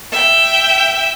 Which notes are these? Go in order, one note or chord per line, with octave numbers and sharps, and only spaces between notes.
E5 G5